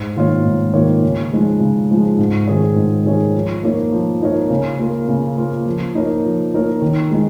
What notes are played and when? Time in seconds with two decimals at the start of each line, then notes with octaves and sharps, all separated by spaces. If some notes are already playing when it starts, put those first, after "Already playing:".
Already playing: G#2
0.17 D#3 A#3 F4 C#5
0.45 G#2
0.74 D#3 A#3 F4 C#5
1.03 C#3
1.32 F3 G#3 D#4
1.60 C#3
1.90 F3 G#3 D#4
2.18 G#2
2.48 D#3 C#4 G#4 C#5
2.76 G#2
3.05 D#3 C#4 G#4 C#5
3.35 F3
3.63 A#3 D#4 A#4 C#5
3.92 F3
4.21 A#3 D#4 A#4 C#5
4.50 C#3
4.79 A#3 F4 A#4
5.09 C#3
5.37 A#3 F4 A#4
5.66 F3
5.95 A#3 D#4 A#4 C#5
6.23 F3
6.54 A#3 D#4 A#4 C#5
6.82 D#3
7.11 G#3 D#4